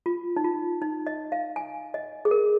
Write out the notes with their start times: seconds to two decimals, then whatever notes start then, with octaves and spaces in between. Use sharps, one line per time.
0.06 F4
0.36 D#4
0.44 F4
0.82 D#4
1.07 D#5
1.32 F5
1.56 G#5
1.94 D#5
2.25 G#4
2.31 A#4